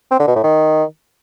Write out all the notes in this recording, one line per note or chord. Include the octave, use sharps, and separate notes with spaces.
C4
D3
B2
A2
D#3